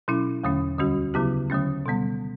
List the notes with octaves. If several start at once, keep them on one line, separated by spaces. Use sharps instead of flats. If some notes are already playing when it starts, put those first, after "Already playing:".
B2 F#3 C#4 E4
E2 D3 F#3 A3 C#4
D2 D3 G3 C#4 F#4
C#3 F#3 B3 E4 G4
D3 F#3 A3 C#4
B2 G3 B3